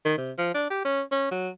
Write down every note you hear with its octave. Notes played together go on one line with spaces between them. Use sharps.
D#3
C3
F3
D4
G4
C#4
C#4
F#3